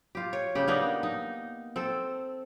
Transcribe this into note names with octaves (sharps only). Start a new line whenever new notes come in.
F4 G4
C#5
C#3 G4
A#3 B3 D4 D#4
D#4
C4 A4